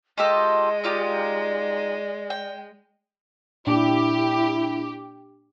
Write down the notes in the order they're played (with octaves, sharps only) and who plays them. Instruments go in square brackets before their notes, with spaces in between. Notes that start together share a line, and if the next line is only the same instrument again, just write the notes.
[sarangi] G#3 [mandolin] F4 G4 A4 [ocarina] D#5
[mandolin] D#4 F4 G4 [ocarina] D5
[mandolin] G5
[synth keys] A#2 D4 D6 [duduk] E4 [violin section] G4